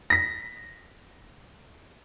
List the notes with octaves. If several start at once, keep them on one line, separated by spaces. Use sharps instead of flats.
A#6 B6